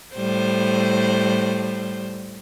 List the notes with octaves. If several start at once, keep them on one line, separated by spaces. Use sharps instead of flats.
A2 G3 C5